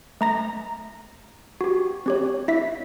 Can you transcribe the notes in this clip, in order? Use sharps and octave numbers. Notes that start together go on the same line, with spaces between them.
A3 A#5 A#6
F#4 G4
C4 G4 C#5
E4 E5 B6